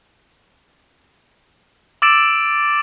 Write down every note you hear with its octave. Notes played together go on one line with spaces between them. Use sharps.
D6 E6 A6 D7 E7